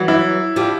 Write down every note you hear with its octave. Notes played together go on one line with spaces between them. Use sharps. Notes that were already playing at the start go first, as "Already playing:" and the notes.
Already playing: E3 F#3
E4
F3 G3